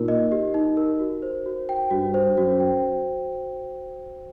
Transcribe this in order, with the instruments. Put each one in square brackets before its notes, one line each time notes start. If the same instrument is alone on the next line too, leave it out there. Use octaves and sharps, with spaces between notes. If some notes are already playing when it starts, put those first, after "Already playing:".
Already playing: [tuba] A#2 [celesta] D#4 G4 A#4
[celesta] D#5
G4
D#4
A#4
F#4
C5
F#4
G5
[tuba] G2 [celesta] F#4
[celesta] C5
[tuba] F#2 [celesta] F#4
[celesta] G5